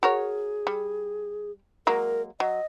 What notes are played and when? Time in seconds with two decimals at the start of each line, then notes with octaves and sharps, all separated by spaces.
0.03 F#4 G#4 A#4 C#5
0.67 G3
1.87 F#3 G#3 A#3 A#4
2.40 F#3 D#5